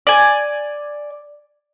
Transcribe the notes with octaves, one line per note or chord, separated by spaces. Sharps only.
D5 G#5